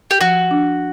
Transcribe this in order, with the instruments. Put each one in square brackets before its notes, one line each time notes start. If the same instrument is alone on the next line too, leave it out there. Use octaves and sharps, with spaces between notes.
[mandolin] G4
[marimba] F3 [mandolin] F#4
[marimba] D4